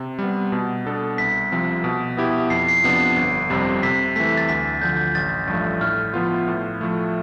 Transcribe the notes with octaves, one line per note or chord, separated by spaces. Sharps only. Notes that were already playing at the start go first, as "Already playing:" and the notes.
Already playing: C3
G3 B3
B2
B3 D4 A4
C2 B6
C3 F3 C4
B2
B3 E4 G4
F2 C7
C7
C3 F3 B3 D4
G1
F2 C3 G3 C4
C3 B6
E3 A3 B6
A6
D2 B6
D3 F3 G6
A1 A6
G2 F3 A3
A2 F6
F3 B3 F4
A2
F3 A3